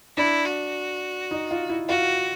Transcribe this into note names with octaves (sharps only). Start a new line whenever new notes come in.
D4 E4
F#4
D#4
F4
E4
F4 F#4